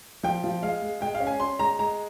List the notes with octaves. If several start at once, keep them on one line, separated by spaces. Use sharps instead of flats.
F3 G5
F3
G#3 F5
G#3
G#3 G5
F5
C#4
G#5
C#4 C6
G#3 A#5
G#3 A#5